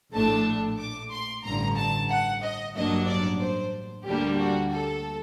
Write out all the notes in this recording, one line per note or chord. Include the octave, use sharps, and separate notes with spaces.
A#1 A2 A3 D4 A5
D6
C6
A1 G2 D3 A#5
A5
F#5
D#5
A1 G2 F#3 A#3 D4 D#5
D5
C5
D2 D3 G3 A#3 D4 G4
F#4
A4